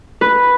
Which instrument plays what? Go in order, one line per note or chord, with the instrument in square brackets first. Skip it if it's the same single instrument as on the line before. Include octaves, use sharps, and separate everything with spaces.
[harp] B4